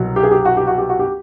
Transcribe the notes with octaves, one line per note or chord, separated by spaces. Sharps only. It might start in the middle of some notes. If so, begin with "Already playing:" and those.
Already playing: C2 B2 F#3
G4
G#4
G4
F#4
G4
F#4
G4
F#4
G4